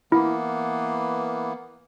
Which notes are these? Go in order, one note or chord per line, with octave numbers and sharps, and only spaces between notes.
E3 A#3 B3 E4